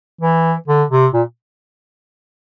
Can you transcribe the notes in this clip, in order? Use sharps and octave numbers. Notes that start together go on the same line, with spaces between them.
E3
D3
C3
A#2